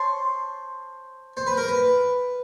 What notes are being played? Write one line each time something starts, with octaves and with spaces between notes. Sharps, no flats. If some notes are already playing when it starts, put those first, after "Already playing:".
Already playing: C5 C#5 A5 C6
C5
B4
A#4
B4